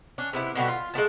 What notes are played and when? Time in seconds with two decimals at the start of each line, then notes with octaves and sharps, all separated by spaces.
0.18 C#4 D4
0.33 C3 B3 E4
0.55 B2 D3 G3 F#4
0.68 F4
0.94 G#3 A3 B3 A5